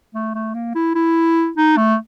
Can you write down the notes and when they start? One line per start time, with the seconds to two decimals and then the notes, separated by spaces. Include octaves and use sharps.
0.14 A3
0.34 A3
0.54 A#3
0.75 E4
0.95 E4
1.57 D#4
1.77 A3